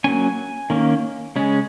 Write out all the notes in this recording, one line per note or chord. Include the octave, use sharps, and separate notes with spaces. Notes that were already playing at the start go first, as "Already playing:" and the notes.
F#3 A#3 C#4 G#5
D#3 A#3 C#4
C#3 G#3 C#4